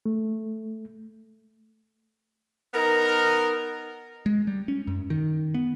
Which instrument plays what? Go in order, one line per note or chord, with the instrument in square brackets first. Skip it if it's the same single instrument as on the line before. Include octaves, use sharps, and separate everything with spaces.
[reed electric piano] A3
[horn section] B3 D#4 A#4
[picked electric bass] G#3
G3
C#4
F#2
D#3
B3